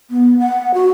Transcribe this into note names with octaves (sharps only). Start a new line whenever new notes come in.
B3
F#5
F#4